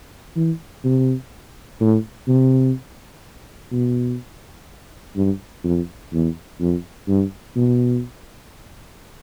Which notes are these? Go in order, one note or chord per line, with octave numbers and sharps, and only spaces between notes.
E3
C3
A2
C3
B2
G2
F2
E2
F2
G2
B2